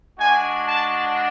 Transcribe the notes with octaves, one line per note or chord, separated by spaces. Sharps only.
G#3 D4 F#4 G#5
A5